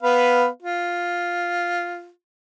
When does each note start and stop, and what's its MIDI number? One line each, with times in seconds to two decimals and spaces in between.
0.03 0.47 59
0.03 0.47 71
0.03 0.47 77
0.63 2.09 65